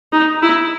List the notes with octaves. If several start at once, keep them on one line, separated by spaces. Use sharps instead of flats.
D#4
E4